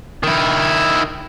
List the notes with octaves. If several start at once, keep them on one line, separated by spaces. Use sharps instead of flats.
D#3 E4